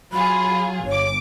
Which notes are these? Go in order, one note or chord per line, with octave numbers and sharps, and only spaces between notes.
F#3 F4 G#4 B5
G1 C#5 D6